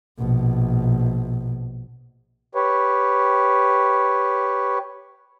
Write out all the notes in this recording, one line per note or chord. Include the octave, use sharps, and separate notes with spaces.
A#1 B2
G4 B4 C#5